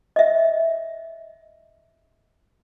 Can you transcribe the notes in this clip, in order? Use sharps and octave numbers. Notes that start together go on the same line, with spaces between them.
D#5 E5